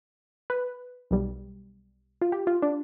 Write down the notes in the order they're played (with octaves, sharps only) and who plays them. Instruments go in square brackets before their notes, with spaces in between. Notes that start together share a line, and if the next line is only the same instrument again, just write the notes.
[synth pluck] B4
B1 B2 G3
F4
G4
F4
D4